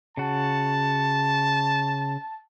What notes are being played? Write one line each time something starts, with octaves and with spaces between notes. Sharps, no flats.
C#3 F#4 A5